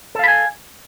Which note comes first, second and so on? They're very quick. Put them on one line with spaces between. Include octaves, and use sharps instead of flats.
A4 F5 B5 G#5